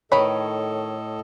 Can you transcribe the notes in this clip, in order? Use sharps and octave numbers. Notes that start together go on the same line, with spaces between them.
A2 D#3 A4 B4 C#5 D#5 B5